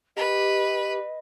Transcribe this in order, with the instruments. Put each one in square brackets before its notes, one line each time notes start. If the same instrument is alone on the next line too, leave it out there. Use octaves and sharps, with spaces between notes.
[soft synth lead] G4 [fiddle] B4 [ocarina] D#5